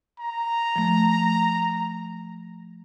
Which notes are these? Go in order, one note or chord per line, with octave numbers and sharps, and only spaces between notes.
A#5
F3 A3